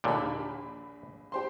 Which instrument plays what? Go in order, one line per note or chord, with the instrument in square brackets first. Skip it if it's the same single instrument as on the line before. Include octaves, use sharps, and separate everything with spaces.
[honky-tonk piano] A#1 B5 [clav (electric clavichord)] D#2 A#2 D3
[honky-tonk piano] G4 C5 C6